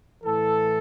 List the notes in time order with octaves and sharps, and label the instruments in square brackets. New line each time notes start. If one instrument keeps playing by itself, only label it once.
[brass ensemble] A2 E3 A4